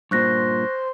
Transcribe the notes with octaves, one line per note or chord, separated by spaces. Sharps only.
G2 A#2 C5 C#6 F#6 A#6